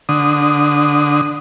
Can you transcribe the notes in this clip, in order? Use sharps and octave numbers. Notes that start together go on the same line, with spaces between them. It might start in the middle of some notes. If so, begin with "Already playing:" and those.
D3 D#6